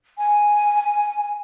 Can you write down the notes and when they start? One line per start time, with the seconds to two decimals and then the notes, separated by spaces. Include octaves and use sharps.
0.18 G#5